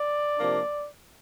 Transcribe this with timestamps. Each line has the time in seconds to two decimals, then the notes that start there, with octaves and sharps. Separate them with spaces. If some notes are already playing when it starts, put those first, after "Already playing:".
Already playing: D5
0.37 C3 F3 A#3 D4